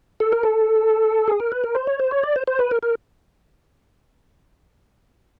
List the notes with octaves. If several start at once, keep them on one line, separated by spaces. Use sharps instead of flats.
A4
A#4
A4
G#4
A#4
B4
A#4
C5
C#5
C5
C#5
D5
C5
C5
B4
A#4
A#4